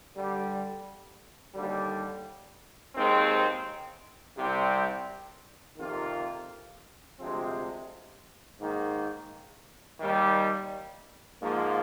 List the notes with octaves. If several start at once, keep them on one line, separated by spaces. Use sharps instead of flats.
G2 D3 G3
D#2 D3 G3
D#2 D#3 G#3 C4
C2 C3 G3 C4 G4
F2 C3 D#3 A#3 F4
D2 C3 F3 G#3 C4
G#2 D#3 A#3
D#2 D#3 G3
G#2 F3 A#3